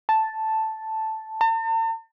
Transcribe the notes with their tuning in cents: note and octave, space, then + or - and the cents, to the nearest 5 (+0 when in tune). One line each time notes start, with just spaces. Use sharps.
A5 +0
A5 +45